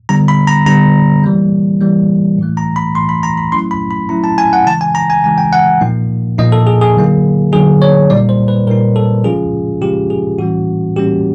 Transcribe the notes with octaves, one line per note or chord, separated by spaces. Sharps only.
D3 G3 B3 A#5
B5
A#5
D3 G3 B3 A#5
E3 G3 A#3
E3 G3 A#3
A2 E3 A3
A#5
B5
A2 E3 A3 C6
B5
A#5
B5
F#3 A3 C#4 E4 C6
B5
B5
F#3 A3 C#4 E4 A#5
A5
G#5
F#5
C#3 E3 G#3 A5
G#5
A#5
G#5
C#3 E3 G#3 G#5
G5
F#5
A#2 F3 A#3 D#4
A#2 F3 A#3 D#4 D#5
A4
G#4
G#4
D3 F#3 A#3 D#4
D3 F#3 A#3 D#4 G#4
C#5
A#2 G3 A#3 D#4 D5
C5
B4
A#2 G3 A#3 D#4 A#4
A4
C#3 F3 G#3 C#4 F4 G#4
C#3 F3 G#3 C#4 F4 G4
G#4
A2 E3 G3 A#3 C#4 F#4
A2 E3 G3 A#3 C#4 G4